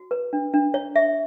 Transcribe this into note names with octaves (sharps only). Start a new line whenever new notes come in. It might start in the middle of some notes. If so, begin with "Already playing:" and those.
Already playing: F#4
B4
D4
D4
C#5
E5